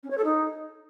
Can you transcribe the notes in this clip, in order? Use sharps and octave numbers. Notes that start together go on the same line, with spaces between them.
C#4
C#5
A4
D#4